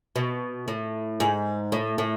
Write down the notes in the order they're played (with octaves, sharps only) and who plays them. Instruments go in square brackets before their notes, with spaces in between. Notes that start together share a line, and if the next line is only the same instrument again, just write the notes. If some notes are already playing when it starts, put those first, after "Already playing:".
[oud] B2
A2
G#2
A2
A2